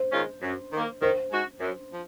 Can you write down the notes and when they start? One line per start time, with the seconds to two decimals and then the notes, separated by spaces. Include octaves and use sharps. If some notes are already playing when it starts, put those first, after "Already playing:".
Already playing: C5
0.12 D#3 G#3 C#4 F4
0.42 F#2
0.72 D#3 A#3
1.01 D#3 C5
1.31 G#3 D#4 F#4
1.60 F#2
1.91 F3